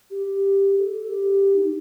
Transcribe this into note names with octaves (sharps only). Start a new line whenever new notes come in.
G4
A4
A4
G4
D#4